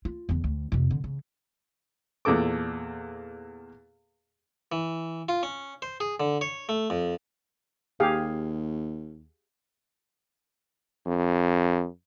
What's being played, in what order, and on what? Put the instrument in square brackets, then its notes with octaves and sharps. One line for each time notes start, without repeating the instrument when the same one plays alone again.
[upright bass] F4
E2 D3
D2
F2 C3
D3
C#3
[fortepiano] E2 A#2 A4 D6
[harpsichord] E3
F4
C#4
C5
G#4
D3
C#5
A3
F2
[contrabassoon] D#2 [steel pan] G4 G#4 F5
[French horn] F2